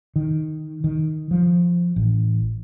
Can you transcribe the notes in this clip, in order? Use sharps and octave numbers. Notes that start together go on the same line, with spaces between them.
D#3
D#3
F3
A1